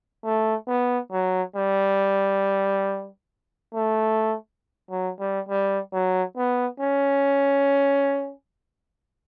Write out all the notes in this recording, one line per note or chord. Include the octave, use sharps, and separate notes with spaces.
A3
B3
F#3
G3
A3
F#3
G3
G3
F#3
B3
C#4